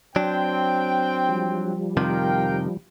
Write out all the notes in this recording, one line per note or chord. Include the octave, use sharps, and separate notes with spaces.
F#3 C4 D4 G5
F3 G3
F2 C3 D#3 A#4 F5 G5